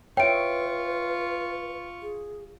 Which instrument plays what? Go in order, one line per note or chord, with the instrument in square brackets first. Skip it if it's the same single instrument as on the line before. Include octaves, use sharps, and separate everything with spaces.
[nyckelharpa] F4 C#6 [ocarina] B4 [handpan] C#5 E5 [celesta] G5 D7
[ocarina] G#4